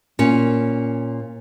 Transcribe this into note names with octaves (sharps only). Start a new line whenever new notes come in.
A#2 C#4